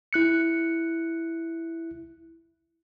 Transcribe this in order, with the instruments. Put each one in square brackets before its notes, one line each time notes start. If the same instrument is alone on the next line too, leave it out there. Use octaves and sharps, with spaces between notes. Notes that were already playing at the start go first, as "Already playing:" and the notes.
[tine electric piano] E4 F#6 C#7